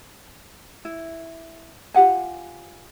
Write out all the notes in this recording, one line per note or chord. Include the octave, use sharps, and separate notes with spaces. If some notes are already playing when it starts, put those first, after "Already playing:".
E4
F4 G4 F#5 G#5